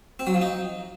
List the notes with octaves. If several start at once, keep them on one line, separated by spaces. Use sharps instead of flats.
C4
F#3
F3
D#4